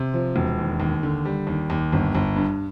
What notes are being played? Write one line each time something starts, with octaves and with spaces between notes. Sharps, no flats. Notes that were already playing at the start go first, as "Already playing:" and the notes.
Already playing: C3
F3
E1
D#2
D#2
D3
G3
D#2
D#2
G1
G1
G2